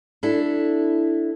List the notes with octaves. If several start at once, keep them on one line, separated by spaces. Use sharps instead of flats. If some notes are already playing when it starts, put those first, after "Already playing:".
D4 E4 A4